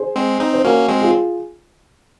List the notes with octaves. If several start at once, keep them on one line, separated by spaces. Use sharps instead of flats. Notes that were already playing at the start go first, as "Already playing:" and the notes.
Already playing: G#4 C5
G#3 C4
C4 D#4
C5
A#3 C#4 F#4 A#4
G#3 C4
F4 G#4